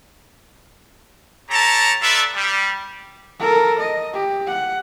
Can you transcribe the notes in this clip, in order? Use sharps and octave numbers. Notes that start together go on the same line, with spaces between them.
G4 A4 C#5 A5 A#5
E4 F4 A4 B4 D5 E5
G3
A4 A#4
D#5
G4
F#5